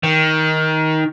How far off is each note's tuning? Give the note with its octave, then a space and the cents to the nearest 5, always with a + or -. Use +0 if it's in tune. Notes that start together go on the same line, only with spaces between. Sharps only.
D#3 +15